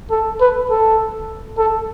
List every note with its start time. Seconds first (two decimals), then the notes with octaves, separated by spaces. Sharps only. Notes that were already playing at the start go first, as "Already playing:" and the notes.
0.11 A4
0.41 B4
0.70 A4
1.58 A4